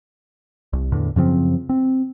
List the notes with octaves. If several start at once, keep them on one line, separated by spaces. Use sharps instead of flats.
C2
E2 A2 D3
F#2 C#3 F3 C4
C4